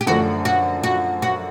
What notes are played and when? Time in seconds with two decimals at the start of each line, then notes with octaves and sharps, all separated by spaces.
0.01 G4
0.07 F#2 D3 F3 A3 D4 F#4
0.45 F#4
0.84 F#4
1.22 F#4